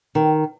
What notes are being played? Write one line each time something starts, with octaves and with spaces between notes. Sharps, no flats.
D#3